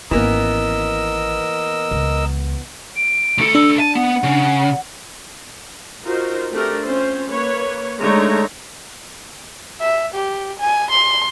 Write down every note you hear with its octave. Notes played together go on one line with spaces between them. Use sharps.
G#1 E3 A#3 B3 C#4 A#4 D#5 E6
C#2
D7
D2 A4
D4 E6
A5 D#7
B3 F#5
C#3
D#4 F4 F#4 A#4 C5
A3 C4 D4 G4 A4 A#4
C4 C#4 F4 C5
A#3 B4 C#5
D3 G#3 A3 D#4 C#5 A#5
E5
G4
G#5
C6